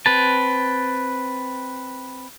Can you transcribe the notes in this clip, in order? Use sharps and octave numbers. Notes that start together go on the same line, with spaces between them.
C4 B4 A5